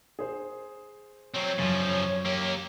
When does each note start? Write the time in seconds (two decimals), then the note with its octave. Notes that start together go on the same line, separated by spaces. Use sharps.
0.19 G#4 C5
1.34 F#3 C4 C#5
1.58 F#2 C#3 F3 A6
2.25 A#3 G4